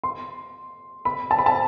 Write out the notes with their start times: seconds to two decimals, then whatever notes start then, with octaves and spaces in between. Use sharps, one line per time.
0.04 C6
1.05 B5
1.31 A5
1.39 B5
1.46 A5